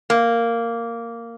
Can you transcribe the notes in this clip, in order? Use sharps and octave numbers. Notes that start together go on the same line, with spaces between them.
A#3